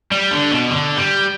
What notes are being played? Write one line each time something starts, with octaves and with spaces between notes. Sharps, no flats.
G3
D3
B2
D3
G3